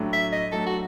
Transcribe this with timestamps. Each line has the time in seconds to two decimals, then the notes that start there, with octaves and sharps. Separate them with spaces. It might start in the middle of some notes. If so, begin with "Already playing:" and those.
Already playing: A2 F#3 A3 D4
0.13 E5
0.32 D#5
0.52 A2 F#3 A3 D4 A4
0.66 F#4